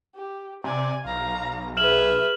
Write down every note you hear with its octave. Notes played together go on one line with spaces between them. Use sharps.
G4
C3 D5 G#5
B1 F5 A#5
G#4 B4 E5 F6 E7 F#7